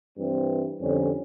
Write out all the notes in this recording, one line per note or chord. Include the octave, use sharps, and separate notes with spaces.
G2 E3 C4
F2 D3 G3 C#4